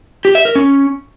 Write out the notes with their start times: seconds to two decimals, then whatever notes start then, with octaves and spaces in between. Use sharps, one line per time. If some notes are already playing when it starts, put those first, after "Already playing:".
0.25 G4
0.35 E5
0.45 A#4
0.55 C#4